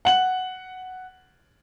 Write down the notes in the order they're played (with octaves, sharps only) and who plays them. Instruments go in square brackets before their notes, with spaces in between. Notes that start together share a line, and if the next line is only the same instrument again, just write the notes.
[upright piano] F#5 F#7